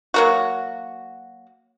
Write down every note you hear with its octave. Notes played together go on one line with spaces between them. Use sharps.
F#3 A#3 F#4